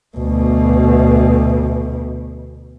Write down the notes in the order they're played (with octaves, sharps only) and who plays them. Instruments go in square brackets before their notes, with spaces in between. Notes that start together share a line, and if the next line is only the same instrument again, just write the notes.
[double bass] D2 B2